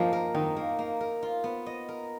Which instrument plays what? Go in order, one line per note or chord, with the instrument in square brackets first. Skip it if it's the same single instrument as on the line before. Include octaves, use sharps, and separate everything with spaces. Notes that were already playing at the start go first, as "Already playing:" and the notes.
Already playing: [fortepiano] F3 [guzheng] A#3 D#4
[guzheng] A#4
[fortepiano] D#3 [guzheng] D#4
[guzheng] A#3
A#3
A#4
F4
B3
D#5
A#4